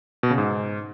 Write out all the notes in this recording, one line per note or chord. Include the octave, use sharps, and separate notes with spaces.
B2
C#3
G#2